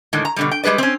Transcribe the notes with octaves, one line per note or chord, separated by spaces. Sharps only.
A2 D3 D#3 G#3
A#5
B2 D3 G3
G5
G3 G#3 G#4 B4 D5
C4 C#4